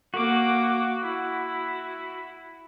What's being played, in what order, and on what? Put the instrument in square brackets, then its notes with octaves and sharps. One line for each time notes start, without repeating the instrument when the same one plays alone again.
[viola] A#3 D6 [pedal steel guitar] F#4
[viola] E4